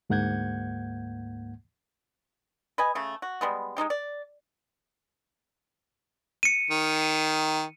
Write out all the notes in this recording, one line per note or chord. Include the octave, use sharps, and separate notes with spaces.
D2 G#2 A#3 F#5 G6 G#6
B4 D#5 G#5
C#3 A3
F#4
G3 G#3 B3
G#3 C4 D#4 G4
D5
C#7 D#7
D#3